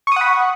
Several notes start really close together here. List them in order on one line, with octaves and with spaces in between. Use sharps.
C#6 D#6 F#5 B5